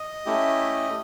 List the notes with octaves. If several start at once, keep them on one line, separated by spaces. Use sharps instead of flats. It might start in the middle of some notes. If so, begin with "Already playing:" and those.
Already playing: D#5
A3 C#4 E4 G4